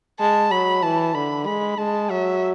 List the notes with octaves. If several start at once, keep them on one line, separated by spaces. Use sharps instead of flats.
G#3 A5
F#3 B5
E3 A5
D3 B5
G#3 B5
G#3 A5
F#3 E5